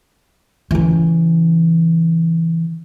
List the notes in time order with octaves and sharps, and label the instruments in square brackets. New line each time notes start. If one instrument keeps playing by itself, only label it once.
[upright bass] C#3 E3